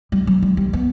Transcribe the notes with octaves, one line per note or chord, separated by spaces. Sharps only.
G3
F#3
G3
G3
B3